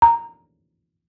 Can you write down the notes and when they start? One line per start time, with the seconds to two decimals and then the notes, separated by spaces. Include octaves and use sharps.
0.02 A#5